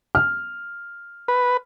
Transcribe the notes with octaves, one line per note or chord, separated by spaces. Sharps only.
F6
B4